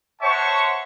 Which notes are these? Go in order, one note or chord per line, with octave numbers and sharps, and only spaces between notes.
C5 C#5 E5 F#5 A5 C#6